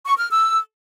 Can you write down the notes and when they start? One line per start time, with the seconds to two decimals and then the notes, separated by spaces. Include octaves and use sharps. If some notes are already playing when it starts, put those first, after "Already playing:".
0.05 C#6
0.17 F6
0.29 E6